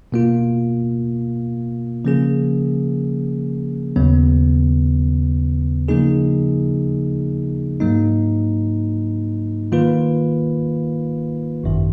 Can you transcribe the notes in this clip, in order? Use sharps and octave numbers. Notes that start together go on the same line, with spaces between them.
B2 A#3 F4
C#3 F3 A#3 C#4 G#4
D#2 C#3 F#3 B3
C#3 F3 A#3 D#4 G#4
G#2 F#3 A#3 D#4
D#3 A#3 F4 B4
G#1 F#2 D#3